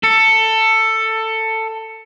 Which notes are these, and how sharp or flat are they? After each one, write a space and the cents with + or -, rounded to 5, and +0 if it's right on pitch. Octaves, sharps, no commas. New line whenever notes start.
A4 +15